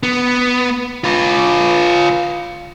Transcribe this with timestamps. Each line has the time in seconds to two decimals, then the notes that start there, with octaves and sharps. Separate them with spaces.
0.03 B3
1.04 F4 B4